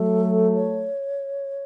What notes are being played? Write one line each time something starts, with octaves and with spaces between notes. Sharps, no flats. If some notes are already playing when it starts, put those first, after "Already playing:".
Already playing: F#3 A3 A4
C#5